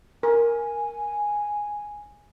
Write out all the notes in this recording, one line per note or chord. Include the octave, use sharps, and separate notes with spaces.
A#4 G#5